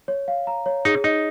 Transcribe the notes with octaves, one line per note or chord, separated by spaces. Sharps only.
C#5
F5
A#5
C#5
D#4 G#4
D#4 D#5